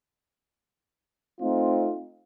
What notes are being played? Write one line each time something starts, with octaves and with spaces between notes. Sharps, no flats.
A3 C4 D#4 F4